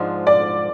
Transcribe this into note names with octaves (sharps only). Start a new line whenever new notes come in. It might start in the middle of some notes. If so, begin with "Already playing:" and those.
Already playing: G#2 F3 G#3 D4
D5